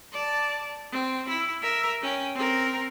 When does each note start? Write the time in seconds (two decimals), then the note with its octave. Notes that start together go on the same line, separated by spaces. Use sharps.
0.12 D5 A5
0.92 C4
1.29 E4
1.62 A#4 E5
2.02 C#4 G5
2.35 C4 A#4